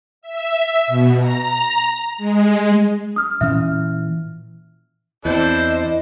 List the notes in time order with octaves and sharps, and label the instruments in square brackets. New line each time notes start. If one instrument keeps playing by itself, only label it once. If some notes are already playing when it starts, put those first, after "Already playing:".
[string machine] E5
B2
A#5
G#3
[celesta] D#6 F6
[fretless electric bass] A#2 E3 C#4 [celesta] E5 F6
[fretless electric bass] E2 C4 [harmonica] D4 A4 C5 [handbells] E4 G6 [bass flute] D#5